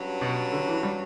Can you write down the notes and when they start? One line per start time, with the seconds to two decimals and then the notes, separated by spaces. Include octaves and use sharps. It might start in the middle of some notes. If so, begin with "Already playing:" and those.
Already playing: G2 F#3 C#4
0.21 B2
0.52 D3
0.67 E3
0.83 G3